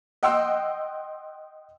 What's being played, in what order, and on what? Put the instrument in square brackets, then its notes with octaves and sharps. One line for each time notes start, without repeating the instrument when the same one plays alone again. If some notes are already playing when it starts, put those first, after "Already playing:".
[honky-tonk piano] D#5 F#5 G5 C6 E6